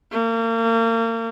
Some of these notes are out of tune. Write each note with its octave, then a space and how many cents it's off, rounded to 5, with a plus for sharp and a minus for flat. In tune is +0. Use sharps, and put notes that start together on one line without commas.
A#3 -35